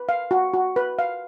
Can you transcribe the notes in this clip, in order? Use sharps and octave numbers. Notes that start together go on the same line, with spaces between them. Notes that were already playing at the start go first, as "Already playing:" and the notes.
Already playing: B4
F5
F#4
F#4
B4
F5